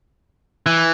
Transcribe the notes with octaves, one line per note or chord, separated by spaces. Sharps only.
E3